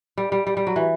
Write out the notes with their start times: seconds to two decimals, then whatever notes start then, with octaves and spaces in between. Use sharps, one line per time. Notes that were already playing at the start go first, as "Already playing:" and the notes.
0.18 G3
0.32 G3
0.47 G3
0.57 G3
0.67 F#3
0.76 E3